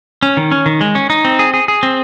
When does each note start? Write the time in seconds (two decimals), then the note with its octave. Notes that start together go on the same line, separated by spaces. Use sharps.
0.23 C#4
0.37 D#3
0.52 C#4
0.66 D#3
0.81 G#3
0.95 C#4
1.10 D#4
1.25 C4
1.39 G#4
1.54 G#4
1.68 G#4
1.83 C4